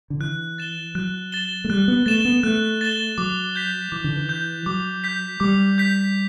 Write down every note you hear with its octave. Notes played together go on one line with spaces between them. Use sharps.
D3
E3 F#6
A6 E7 G7
F#3 F#6
A6 E7 G7
A3
G3 F#6
B3
A3 A6 E7 G7
B3
A3 F#6
A6 E7 G7
F#3 D6
G6 B6
E3 D6
D3
E3
G6 B6
F#3 D6
G6 B6
G3 D6
G6 B6